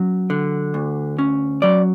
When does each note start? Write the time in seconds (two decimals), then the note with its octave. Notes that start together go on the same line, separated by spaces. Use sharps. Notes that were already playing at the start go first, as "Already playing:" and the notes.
Already playing: F#3 C#4
0.30 D3
0.74 D2
1.19 C#4
1.62 F#3 D5